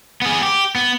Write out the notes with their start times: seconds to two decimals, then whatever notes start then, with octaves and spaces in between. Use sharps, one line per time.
0.22 B3 G#4
0.43 G4
0.75 B3